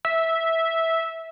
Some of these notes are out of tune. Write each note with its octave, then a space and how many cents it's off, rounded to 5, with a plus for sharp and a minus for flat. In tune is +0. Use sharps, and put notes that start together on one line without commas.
E5 -10